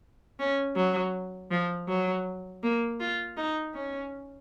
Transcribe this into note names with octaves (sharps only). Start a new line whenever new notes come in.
C#4
F#3
F3
F#3
A#3
F4
D#4
C#4